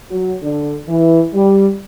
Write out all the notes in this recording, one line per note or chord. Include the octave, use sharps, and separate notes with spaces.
F#3
D3
E3
G3